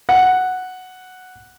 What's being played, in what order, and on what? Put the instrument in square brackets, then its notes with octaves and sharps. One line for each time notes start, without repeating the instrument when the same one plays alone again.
[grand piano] F#5